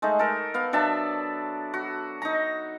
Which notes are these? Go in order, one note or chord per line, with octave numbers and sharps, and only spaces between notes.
G#3 A3 D#4
A4 A#4
B3 F5
F#3 D4 E5 A5
F#4
D#4 A#5